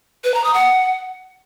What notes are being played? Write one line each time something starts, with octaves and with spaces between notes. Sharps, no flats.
B4
A#5
D#6
F#5